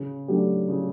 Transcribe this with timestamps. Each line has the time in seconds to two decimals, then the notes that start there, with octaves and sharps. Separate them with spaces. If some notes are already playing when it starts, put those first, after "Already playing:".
Already playing: C#3
0.28 F#3 A3 D4 G4
0.69 C#3